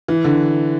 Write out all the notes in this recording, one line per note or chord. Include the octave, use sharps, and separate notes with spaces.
E3
D3